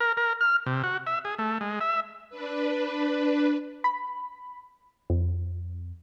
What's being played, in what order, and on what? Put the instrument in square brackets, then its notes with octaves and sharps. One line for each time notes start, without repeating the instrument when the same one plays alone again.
[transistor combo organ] A#4
A#4
F6
C3
F#4
E5
G#4
A3
G#3
E5
[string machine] D4 B4
[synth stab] B5
F2